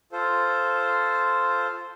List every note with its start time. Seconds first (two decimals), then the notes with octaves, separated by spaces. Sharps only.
0.12 F4 A4 C5